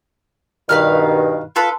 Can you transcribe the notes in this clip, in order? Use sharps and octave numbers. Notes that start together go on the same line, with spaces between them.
G2 B2 D#3 B4 F5 F6
F4 A4 B4